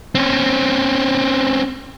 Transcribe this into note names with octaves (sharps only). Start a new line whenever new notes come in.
C4 C#4